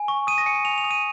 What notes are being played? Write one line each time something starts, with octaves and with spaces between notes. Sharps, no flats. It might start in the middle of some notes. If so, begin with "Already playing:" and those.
Already playing: G#5
C#6
D#6 D#7
A#6
G#5 C#7
D#7
G#5 F7
F7
D#6
D#7